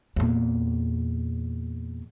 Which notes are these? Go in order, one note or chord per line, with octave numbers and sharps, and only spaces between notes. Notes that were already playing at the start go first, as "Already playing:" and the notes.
E2 A#2